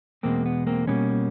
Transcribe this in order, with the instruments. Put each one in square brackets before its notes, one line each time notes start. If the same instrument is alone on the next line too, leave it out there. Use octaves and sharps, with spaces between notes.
[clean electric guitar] E2 B2 G#3 A#3 C4
B3
A#3 C4
B2 G3 A#3 B3 C#4